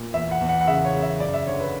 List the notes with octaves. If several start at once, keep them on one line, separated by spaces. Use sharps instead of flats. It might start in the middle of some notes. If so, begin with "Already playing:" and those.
Already playing: A#2
E2 E5
F#5
E2
F#5
F#5
C#3 E5
C#5
C#3
E5
F#2 D5
E5
D3 C#5
B4